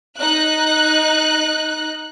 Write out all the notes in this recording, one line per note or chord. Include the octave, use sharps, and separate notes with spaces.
D#4 F#6